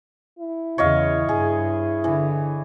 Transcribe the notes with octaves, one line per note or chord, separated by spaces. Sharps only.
E4
E2 C#3 C#5 D#5 F5
G2 G#4
D3 E3